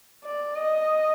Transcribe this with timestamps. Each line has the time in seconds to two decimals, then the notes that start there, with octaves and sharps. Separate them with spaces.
0.24 D5
0.56 D#5